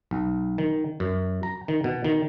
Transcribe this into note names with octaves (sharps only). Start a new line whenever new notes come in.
B1
D#3
F#2
A#5
D#3
B2
D#3